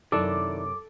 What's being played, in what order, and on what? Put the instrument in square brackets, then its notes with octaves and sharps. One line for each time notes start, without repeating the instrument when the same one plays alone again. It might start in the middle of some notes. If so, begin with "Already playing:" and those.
[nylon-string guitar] F#2 C3 [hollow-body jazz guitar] D#3 D4 E4 [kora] A4 [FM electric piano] D6